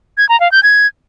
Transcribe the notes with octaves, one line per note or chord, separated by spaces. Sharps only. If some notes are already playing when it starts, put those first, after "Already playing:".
G#6
A#5
F5
G6
G#6